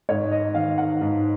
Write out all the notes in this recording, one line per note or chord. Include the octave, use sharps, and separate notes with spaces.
G#2 C#5
D#5
D#3 F5
F#5
G#2